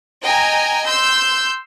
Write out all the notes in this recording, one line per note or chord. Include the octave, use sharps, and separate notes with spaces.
D#5 G5 G#5 A#5
C6 E6 G6